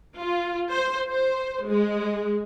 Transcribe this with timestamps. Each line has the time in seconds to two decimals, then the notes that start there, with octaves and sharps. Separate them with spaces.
0.19 F4
0.71 C5
1.09 C5
1.66 G#3